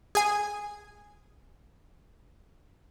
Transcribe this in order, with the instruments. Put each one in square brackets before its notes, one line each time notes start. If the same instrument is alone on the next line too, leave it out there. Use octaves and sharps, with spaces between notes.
[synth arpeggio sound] G#4 G#5